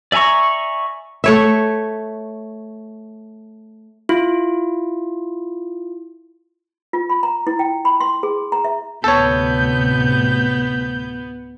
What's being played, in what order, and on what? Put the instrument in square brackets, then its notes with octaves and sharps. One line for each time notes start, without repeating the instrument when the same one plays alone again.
[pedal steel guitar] D5 E5 G#5 A#5 C#6
[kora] A3 C#5 E5
[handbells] E4 F4
[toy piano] F4
B5
A#5
E4
G5
B5
C6
G#4
A#5
E5
[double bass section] D2 A2 C3 [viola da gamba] B3 [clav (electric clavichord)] A4 C#5 [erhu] G6